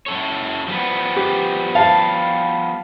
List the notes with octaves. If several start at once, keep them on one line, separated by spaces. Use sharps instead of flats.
F#2 A4 C#5
F3 G3 B3
G4
F5 A5